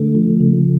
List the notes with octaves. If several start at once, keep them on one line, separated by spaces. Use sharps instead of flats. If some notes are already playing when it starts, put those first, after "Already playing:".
Already playing: D3 A3
F3
C#3